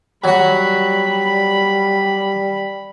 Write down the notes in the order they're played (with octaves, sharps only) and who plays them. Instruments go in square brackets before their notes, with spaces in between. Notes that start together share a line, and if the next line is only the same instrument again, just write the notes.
[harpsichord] F#3 F#4 [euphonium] G3 [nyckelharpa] B5